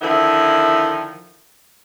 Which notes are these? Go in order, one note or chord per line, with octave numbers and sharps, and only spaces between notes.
D3 D#3 F3 E4